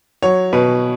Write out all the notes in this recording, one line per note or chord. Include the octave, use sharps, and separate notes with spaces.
F#3 C#5
B2 B4